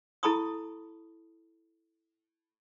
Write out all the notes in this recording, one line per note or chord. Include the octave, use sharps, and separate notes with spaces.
E4 A4 A5 B5 C#6 D#6